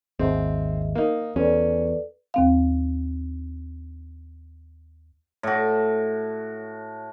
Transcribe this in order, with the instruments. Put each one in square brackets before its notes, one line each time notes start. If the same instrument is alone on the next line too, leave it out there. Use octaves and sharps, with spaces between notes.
[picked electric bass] G#1 D#2 [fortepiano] C4 [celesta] G#4 D#5 E5
[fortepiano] A#3 D#4
[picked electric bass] E2 [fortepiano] C#4 [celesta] A4 B4 D5
[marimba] D#2 C4 F5
[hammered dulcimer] A2 F#4